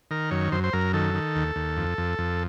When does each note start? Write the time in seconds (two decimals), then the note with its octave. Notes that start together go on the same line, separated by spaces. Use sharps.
0.11 D#3 A#4
0.31 F#2 C#5
0.52 F#2 C5
0.64 C5
0.73 F#2 A#4
0.94 D#3 A4
1.14 D#3
1.36 D#2
1.56 D#2
1.77 F2
1.98 F2
2.18 F2